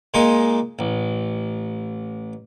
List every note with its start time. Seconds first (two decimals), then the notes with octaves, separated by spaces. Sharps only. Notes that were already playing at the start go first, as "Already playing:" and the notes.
0.14 A#2 G#3 D#4 C6
0.79 A1